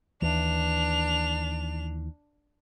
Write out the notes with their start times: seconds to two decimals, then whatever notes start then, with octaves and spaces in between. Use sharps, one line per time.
0.22 D#2 E3 D4 F7